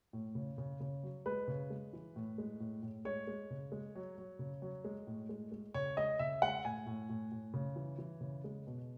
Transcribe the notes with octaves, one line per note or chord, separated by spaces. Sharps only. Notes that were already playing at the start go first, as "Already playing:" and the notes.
A2
C#3
C#3
C#3
F#3
G#3 B4
C#3
G#3
E3
A2
G#3
A2
A2
G#3 C#5
G#3
C#3
G#3
F#3
F#3
C#3
F#3
G#3
A2
G#3
G#3
C#3 C#5
G#3 D#5
C#3 E5
G#3 F#5
A2 G#5
A2
A2
A2
C#3
E3
E3
C#3
G#3
B2